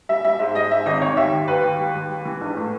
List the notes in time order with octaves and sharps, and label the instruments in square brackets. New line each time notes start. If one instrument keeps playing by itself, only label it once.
[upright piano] G3 E5
G3 E5
G#2 E5
G3 D#5
G#2 E5
G#1 D#5
D#3 C#5
D#2 E5
D#2
D#2 B4
D#2
G3
D#2
G3
E3
A#1
A2